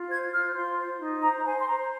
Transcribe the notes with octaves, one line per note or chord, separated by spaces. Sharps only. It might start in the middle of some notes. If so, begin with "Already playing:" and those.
Already playing: F4
C5 G#6
F4 F6
F4 C6
C5
D#4
C5 A#5
A#5
C5 G#5
C6
C5 A#5